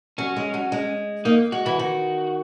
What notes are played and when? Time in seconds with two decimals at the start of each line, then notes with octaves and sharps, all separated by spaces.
0.18 F#3 C#4
0.36 G#3
0.54 F#3
0.72 G#3
1.25 A#3 D#4
1.52 G#3 F#4
1.65 E3 F#4
1.79 D#3 F#4